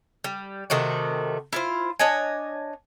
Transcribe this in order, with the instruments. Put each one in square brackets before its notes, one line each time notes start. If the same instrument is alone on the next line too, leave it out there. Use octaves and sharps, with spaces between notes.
[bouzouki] G3
C3 D#3 A3 F#4
E4 F4 C5
D4 C#5 D#5 G#5